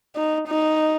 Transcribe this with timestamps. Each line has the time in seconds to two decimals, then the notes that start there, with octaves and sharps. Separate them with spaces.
0.16 D#4
0.48 D#4